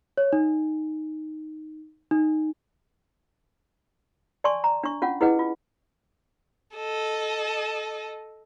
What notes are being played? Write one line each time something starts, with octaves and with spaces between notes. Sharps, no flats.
C#5
D#4
D#4
D5 G#5 A5 C6 C#6
A#5
D4 C#6
C#4 F4 F#5
E4 G#4 B4 D#5 F#5 G5
F4
A4 D#5